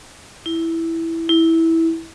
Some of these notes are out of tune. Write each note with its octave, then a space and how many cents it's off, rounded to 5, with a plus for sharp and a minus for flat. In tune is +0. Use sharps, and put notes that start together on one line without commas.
E4 +0
E4 -10